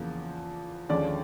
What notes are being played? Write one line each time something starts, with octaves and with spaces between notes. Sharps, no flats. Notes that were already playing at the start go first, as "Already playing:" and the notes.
Already playing: E2 C#3 F3 A#3
D#2 D3 F3 G#3 C#4 D5